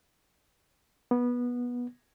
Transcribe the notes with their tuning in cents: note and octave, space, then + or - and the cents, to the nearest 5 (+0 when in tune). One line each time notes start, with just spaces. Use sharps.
B3 -15